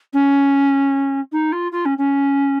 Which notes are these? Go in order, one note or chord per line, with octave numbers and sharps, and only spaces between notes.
C#4
D#4
F4
F4
C#4
C#4